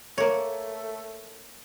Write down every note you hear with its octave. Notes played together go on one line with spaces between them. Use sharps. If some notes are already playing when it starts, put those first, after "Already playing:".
A3 A#3 C#5